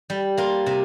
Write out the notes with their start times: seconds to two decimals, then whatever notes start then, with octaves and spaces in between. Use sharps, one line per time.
0.10 G3
0.37 A#3 F4
0.66 C3